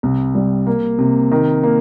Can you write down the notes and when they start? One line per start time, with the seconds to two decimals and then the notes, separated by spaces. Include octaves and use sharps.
0.03 C2
0.35 G3
0.67 A#3
0.99 C3
1.31 D#3
1.63 A#3